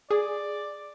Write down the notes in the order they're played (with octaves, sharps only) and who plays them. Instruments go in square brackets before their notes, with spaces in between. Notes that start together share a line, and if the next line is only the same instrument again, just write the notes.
[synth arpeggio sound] G#4 [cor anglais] D5